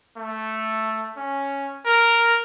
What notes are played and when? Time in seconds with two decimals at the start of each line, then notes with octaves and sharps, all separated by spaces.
0.17 A3
1.17 C#4
1.86 A#4